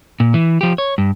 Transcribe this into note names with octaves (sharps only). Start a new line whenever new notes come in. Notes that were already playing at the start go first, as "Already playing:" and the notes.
A#2
E3
F3 G4
C#5
G2